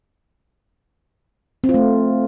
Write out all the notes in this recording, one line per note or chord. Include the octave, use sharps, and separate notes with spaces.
C4
F4
A3